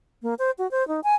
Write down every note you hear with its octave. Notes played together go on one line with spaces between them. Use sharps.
A#3
C5
F#4
C5
D#4
G#5